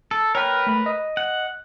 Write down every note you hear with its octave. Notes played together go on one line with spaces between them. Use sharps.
A4
A#4 B4 C#5 G5 F6
A3 B5
D#5
F#5